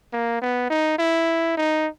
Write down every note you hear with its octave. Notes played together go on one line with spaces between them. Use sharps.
A#3
B3
D#4
E4
D#4